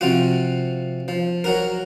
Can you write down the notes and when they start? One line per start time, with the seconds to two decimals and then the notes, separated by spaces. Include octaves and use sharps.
0.01 C3 F3 F4 F#4
1.08 F3
1.44 F#3 F#4 A#4